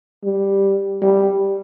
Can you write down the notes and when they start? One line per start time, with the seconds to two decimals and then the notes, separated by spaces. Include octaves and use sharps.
0.24 G3
1.02 G3